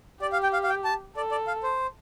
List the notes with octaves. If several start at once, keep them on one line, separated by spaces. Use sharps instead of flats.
G4 D5
F5
G5
F5
F5
G5
A5
A4 D5
D5
F5
C5